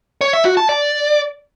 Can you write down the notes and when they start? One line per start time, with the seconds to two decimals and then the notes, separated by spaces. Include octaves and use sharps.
0.21 C#5
0.33 E5
0.45 F#4
0.57 A5
0.69 D5